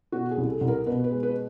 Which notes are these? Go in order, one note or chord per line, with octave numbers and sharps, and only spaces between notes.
B2 F#4
G#4
C2
A4
C2
A#4
B2 B4
B4
G#3
B4